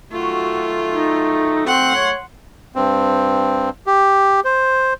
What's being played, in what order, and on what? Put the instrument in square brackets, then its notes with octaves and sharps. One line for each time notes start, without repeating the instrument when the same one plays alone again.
[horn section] D#3 F#3 A3 [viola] F4 [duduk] F#4
[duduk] D#4
[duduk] C4 [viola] F#5 C6
[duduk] C#5
[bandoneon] G2 C4
G4
C5